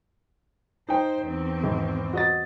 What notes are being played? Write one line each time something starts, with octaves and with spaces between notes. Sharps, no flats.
D#4 C5 G5
E2 C4
G#1
F#4 D#5 A6